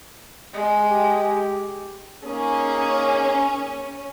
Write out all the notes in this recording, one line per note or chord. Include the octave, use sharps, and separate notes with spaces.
G#3
G4
A#3 C#4 D#4 G#4